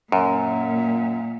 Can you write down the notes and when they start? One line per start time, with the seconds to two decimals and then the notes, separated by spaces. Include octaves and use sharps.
0.12 F#2 A#2